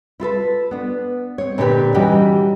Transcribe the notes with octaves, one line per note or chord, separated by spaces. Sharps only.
E4 F4 A4 B4
B3 D4
C4 C#5
A#2 D3 C4 E4 G4 B4
E3 G3 C#4 D#4 F#4 G4